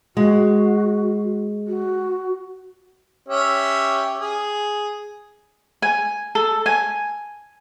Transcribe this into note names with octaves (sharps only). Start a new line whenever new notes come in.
G#3 F#4
F#4
C#4 G4 E5
G#4
G#5
A4
G#5